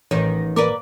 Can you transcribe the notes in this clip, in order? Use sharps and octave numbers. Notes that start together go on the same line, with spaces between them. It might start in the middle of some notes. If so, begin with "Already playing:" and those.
A1 D#3 D#4 C#5 A#6
A#3 A#4 B4 D5 D6